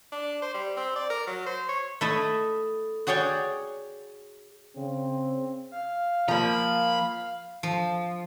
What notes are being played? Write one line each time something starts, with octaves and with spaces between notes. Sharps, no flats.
D4
C5
G3
C4
D5
A#4
F#3
C5
C#5
A3 E4 D#5
F#4 G#4 C#5 D5 G5
C#3 C4
F5
F3 A#3 A#5 B5
F3